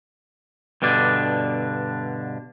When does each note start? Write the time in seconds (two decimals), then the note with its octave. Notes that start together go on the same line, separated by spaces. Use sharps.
0.82 G2 B2 D3 D4